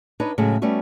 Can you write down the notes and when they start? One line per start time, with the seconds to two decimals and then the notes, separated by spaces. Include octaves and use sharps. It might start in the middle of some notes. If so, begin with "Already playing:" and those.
0.20 D4 D#4 B4 C#5 D5
0.38 A2 C#3 F#3 G#3 A3
0.62 G3 A3 B3 C#4 F#4